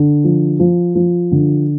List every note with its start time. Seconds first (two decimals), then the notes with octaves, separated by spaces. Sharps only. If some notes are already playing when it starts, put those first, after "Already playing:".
Already playing: D3
0.24 F3
0.59 F3
0.95 F3
1.31 D3